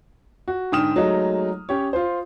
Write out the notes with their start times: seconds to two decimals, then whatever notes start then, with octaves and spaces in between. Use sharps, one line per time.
0.48 F#4
0.72 G#2 D3 G5 D#6 F6 E7
0.96 F#3 G#3 A3 D#4
1.69 C#4 G4 C#5
1.93 F4 C5